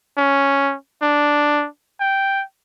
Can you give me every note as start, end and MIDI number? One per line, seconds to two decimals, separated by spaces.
0.17 0.75 61
1.02 1.66 62
2.00 2.43 79